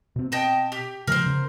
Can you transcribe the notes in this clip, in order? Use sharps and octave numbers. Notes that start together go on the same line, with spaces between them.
B2 C4
D#5 G5 A5
G4
C#3 F3 G#3 A#4 C5
C#3